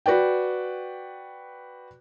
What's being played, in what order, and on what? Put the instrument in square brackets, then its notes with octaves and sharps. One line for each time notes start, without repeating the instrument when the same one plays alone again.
[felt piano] F#4 B4 D5 G5